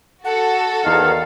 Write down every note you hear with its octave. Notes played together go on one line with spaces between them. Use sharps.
F#4 A4 F#5 A5
E2 D#3 F5